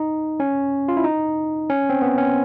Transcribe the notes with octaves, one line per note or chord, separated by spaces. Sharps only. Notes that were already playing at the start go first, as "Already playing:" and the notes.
Already playing: D#4
C#4
F4
E4
D#4
C#4
C4
B3
C#4